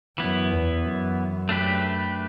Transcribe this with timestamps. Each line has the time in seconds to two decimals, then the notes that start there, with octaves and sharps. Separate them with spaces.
0.18 F#2 E3 B3 E4
0.51 E2
0.84 F#2
1.49 A3 D4 G4 B4